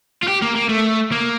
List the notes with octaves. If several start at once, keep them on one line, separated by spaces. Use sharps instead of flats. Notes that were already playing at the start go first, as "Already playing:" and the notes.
F4
G4
A#3
A#3
A3
A#3